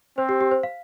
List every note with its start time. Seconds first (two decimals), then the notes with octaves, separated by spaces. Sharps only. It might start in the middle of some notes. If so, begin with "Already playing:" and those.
0.17 C4 C5
0.29 G4
0.41 G4
0.51 C5
0.63 F5